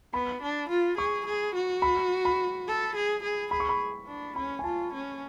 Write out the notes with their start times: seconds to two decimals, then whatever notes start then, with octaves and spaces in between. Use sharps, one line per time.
0.13 B3 B5
0.42 D4
0.70 F4
0.98 G#4 C#6
1.26 G#4
1.55 F#4
1.82 B5
2.25 B5
2.67 A4
2.95 G#4
3.23 G#4
3.51 G#4 B5
3.60 C#6
3.69 B5
4.07 D4
4.36 C#4 B5
4.59 G#5
4.64 F4 A5
4.93 C#4